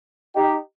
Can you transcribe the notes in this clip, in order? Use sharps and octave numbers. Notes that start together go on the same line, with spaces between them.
D#4 G4